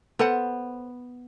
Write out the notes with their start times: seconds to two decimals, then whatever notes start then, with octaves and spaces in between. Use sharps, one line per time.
0.19 B3 A4 C5 F#5